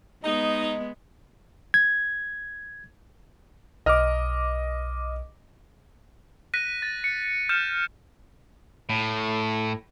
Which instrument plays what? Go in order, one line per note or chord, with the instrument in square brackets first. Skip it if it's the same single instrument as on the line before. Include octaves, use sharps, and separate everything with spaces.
[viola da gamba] G#3 B3 [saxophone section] D#4 [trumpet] D#5
[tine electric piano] G#6
[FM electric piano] B1 D6 [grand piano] D#5 F6
[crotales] F#6 A#6 B6 D#7
A6
C#7
F6 G6 C#7 E7
[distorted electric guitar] A2